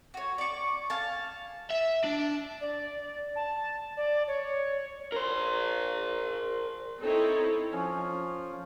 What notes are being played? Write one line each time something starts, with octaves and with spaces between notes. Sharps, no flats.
F#4 C#5
D5 C#6
F5 G#5 A5
E5
D4
D5
A5
D5
C#5
A#4 C5
C4 D#4 E4 A4 C#5
F3 C#4